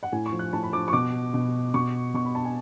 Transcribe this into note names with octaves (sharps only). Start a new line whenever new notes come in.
F#5
A2 G#5
C#6
F3
F#6
A2 A5
B5
F3 D6
C#6
B2 D6
B2
B2 C#6
B2 C#6
B5
A5
G#5